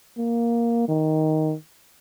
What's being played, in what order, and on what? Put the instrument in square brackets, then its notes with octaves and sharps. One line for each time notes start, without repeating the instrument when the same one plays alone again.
[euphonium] A#3
D#3